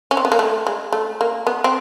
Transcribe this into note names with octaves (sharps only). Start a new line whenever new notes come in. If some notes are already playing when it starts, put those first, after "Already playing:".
C#4
C4
B3
A#3
A3
G#3
A3
A#3
B3
C4